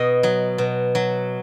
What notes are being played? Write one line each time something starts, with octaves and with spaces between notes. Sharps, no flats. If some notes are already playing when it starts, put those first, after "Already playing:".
Already playing: B2 D#5
F#3
B2
F#3